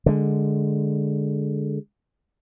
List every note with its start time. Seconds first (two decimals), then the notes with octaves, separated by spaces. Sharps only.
0.06 D3 G#3